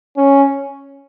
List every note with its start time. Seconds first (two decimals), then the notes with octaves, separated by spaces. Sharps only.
0.17 C#4